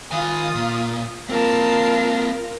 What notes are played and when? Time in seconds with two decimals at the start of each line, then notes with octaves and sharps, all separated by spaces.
0.11 D#3 F4 G#5 D#6
0.55 A#2
1.29 A#3 C4 F4 A#4 A5 C7